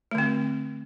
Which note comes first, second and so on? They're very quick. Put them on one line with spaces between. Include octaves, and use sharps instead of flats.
A3 D3 C4